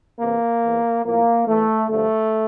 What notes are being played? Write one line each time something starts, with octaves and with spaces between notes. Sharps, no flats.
E2 C3 E3 A#3
E2 E3
A2 F3 A#3
E2 E3 A3
G2 D3 F3 A3